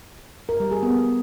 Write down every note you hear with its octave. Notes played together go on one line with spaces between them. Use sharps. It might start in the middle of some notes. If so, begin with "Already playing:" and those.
A#4
G3
G#4
B3